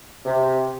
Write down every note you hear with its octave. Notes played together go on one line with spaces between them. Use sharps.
C3